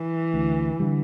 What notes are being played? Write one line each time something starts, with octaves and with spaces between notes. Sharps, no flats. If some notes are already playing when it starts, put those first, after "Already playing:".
Already playing: E3
D2
D3 G3